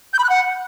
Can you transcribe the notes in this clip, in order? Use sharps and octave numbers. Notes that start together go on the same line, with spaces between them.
G6
B5
F#6
F#5